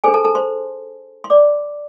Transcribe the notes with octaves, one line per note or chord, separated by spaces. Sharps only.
D4 G#4 A4 C5 G#5
A4 A5
A4 A5
C5 C6
C6
D5 D6